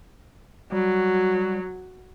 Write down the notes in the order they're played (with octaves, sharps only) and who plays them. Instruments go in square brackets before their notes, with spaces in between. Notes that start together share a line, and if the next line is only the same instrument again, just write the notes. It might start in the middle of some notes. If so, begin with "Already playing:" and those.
[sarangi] F#3 [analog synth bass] G3